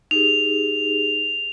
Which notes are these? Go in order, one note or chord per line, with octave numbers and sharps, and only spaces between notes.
D#4 G4 G#4 F7